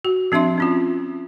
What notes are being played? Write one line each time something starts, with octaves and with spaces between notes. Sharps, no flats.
F#4
F3 C4 D4 E5 C6
C4 C#4 F4